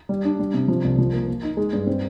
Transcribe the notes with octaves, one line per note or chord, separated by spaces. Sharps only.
G3
D4
G3
C3
F3
C2
F3
A#3
A#3
D#4
G#3
G2
C4